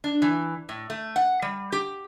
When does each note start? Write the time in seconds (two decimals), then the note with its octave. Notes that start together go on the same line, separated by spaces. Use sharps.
0.04 D4
0.22 E3
0.69 A2
0.90 A3
1.16 F#5
1.42 G3
1.72 G4